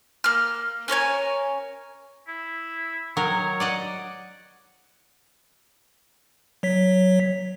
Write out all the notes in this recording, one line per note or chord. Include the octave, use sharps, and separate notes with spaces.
A#3 F6
C#4 A#4 C#5 G#5
E4
D#3 F#3 A#4 C#5
D5 D#5 F#5
F#3 C#5 B6